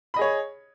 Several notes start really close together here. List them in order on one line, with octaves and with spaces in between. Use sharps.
B5 D#5 G#4 C#5